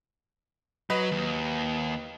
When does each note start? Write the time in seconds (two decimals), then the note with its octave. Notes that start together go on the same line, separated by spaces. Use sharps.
0.90 F#3 B4 D#5
1.11 D#2